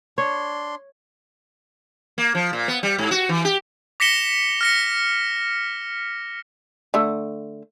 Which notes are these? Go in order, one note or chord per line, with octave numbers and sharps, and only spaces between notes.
D4 C#5 C6
A#3
F3
A#2
B3
G3
G#2
F#4
E3
G4
D6 A#6 B6 C#7 E7 G7
F6 A#6 C#7
D3 A3